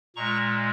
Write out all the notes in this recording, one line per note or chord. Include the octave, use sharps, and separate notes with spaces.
A#2 G#3 A#5 C#6